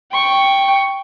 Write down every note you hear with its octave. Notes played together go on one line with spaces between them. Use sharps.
G5 C#6